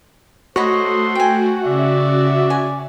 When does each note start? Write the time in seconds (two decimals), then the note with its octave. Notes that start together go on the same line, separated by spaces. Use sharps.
0.56 A3 F#4 A4 C5 C#5 D#5 B5 C6
1.15 G5 G#5
1.64 C#3 D5 E5
2.50 G#5